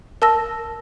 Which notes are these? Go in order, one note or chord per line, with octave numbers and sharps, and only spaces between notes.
A#4 A5 E6 A#6